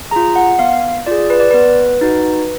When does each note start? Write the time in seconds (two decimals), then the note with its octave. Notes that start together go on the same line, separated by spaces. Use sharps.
0.11 F4 G#4 A#5
0.36 F#5
0.59 B3 F5
1.06 F4 G#4 D5
1.30 B4
1.40 D5
1.51 B3 B4
2.01 D#4 F#4